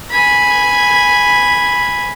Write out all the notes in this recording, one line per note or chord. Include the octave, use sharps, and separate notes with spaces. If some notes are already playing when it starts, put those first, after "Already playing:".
G#5 B5